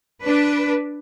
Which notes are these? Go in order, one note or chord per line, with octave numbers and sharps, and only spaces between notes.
D4 B4